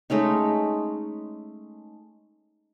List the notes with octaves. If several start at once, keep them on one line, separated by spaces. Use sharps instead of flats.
G#3 A3 C#4 D#4